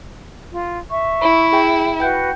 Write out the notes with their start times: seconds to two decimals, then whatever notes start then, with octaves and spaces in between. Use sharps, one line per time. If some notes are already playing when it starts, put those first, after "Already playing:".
0.52 F4
0.91 E5 C#6
1.22 E4 B5
1.52 G#4 G5 G#5
2.00 F#4 B4 F#5 G5 G6